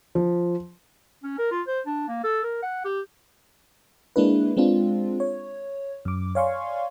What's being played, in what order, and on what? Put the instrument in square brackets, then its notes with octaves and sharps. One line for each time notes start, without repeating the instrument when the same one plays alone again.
[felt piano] F3
[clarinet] C#4
A#4
F4
C5
D4
A#3
A4
A#4
F#5
G4
[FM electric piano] G#3 A#3 D4 E4 B4
G#3 C4 D4 F4
C#5
F#2 D6
C#5 D5 F5 G#5 C6 C#6